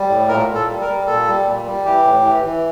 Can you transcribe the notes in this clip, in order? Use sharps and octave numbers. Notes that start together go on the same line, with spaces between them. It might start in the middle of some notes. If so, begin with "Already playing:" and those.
Already playing: G3
A2
A#2 A#4
A#2
A4
G3
A#4
G3
A#2 A4
G3
A#2
G3
E3 G4
A2
E3
E3